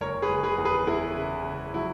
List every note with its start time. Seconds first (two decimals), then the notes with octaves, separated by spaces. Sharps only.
0.01 F#1 A#4 C#5
0.22 G#4 B4
0.29 F#1
0.43 G#4 B4
0.58 E2
0.65 G#4 B4
0.87 E2 E4 G#4
1.16 C#3
1.44 C#3
1.74 F#3 E4